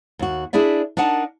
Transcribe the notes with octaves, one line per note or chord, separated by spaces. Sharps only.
D#2 F#4
D4 E4 G#4 D5 E5
D4 D#4 A#4 F#5 A5